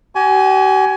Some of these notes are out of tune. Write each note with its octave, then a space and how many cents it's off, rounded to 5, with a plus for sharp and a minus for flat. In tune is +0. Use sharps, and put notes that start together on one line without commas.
G4 -45 G#5 +15